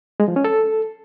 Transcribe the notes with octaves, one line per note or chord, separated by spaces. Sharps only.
G#3
F3
C#4
A4